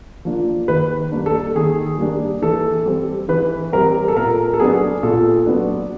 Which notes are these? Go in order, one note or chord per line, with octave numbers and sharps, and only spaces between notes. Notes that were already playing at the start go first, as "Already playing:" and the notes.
F3 A#3 D4
D#3 B4
G3 A#3 D4
A4
D#3 G#4
G3 A#3 D4
E3 A4
G3 C4
E3 B4
G3 C4 A#4
A4
A#2 A#4
A4
F#3 B3 D4 G#4
A#2 A4
F#3 B3 D4